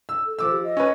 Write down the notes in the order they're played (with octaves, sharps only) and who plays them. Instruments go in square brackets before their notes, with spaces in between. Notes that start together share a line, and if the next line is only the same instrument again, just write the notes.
[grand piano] E6
[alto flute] A4
[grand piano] F3 D6 E6
[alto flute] G4
D#5
[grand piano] C#4 B4